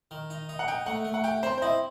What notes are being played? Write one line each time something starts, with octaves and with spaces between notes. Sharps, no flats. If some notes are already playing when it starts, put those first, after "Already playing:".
D#3
D#4
D#4
F#5
D#4 G5
A3 F#5
A3
F#5
G4 G5
C4 C5
C5
E4 D#5